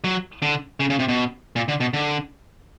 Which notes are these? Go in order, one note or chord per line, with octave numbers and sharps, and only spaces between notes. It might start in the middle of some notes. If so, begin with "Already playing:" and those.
F#3
D3
C#3
C#3
C3
B2
A#2
D3
B2
D3